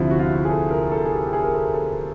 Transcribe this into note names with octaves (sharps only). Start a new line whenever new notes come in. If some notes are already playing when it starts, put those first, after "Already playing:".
Already playing: D2 C3 F3 E4
F#4
F4
G#4
A4
A#4
A4
G#4
G4
G4
G#4
A#4
A4
A4